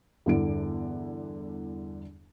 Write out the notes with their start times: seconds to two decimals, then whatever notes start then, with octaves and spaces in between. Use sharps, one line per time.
0.26 E2 G2 D3 E3 D7